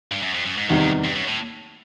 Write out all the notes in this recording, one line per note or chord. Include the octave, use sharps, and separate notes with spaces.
G2
F#2
F2
F#2
G#2
E2 G2 C3 D#3 G3
F2
G2
F#2
A2